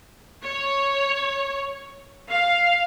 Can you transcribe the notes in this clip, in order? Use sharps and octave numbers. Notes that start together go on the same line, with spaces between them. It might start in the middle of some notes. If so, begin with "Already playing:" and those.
C#5
F5